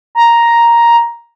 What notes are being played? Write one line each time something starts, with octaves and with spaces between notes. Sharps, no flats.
A#5